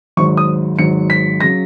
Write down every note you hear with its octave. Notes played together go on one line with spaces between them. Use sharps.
G#1 G#2 F#3 C#6
D#6
G#1 G#2 F#3 C#7
B6
C#3 F#3 A#6